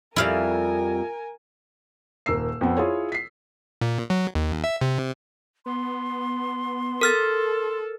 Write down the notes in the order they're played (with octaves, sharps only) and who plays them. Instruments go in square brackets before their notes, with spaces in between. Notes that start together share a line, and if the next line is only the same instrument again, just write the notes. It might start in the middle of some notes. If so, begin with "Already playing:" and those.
[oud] F2 G3 [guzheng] E4 F5 [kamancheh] A#4 G#5
[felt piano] D#1 A#4 E6 C7
F2 B3
E4 F4 G#4 C#5
B6 C7
[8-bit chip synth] A#2
F#3
D#2
E5
C3
[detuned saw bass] B3 [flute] C6
[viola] A4 [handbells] A#4 F6 A6